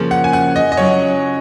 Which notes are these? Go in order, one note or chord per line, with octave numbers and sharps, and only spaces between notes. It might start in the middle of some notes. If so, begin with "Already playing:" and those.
Already playing: C#3 F3 A#3 C#4 G#4
F#5
G#5
F#5
D#5
D#5
C#3 F#3 C#4 F4 C#5